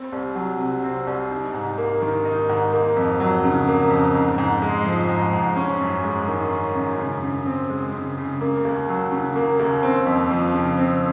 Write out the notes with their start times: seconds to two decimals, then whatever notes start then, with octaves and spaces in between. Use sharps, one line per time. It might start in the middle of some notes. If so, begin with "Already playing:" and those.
Already playing: C4
0.12 C2
0.35 F#3
0.59 C3
0.83 C4
1.07 C2
1.30 D#4
1.54 G#2
1.78 A#3
2.02 D#3
2.25 D#4
2.49 G#2
2.72 A#3
2.96 F2
3.20 F#3
3.44 C#3
3.67 A#3
3.90 F2
4.15 G#2
4.38 G#2
4.62 G#3
4.86 F3
5.09 G#2
5.33 G#2
5.56 C#4
5.81 F#2
6.04 G#3
6.28 D#3
6.51 C#4
6.75 F#2
6.99 C#3
7.23 C#3
7.46 C4
7.70 G#3
7.93 C#3
8.18 C#3
8.41 A#3
8.65 D#2
8.89 F#3
9.12 C#3
9.36 A#3
9.59 D#2
9.83 C4
10.07 F2
10.31 F3
10.54 C#3
10.77 C4